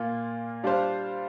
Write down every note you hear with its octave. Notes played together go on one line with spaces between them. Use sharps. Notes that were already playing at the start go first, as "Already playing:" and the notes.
Already playing: A#2 A#3 F4
G3 D4 F4 C5 F5